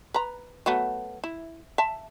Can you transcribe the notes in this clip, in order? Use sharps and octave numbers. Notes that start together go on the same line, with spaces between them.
B4 A#5
F#3 A3 B3
E4
E5 A5